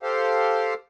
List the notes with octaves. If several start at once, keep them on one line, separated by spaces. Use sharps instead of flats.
G4 A4 C5 F5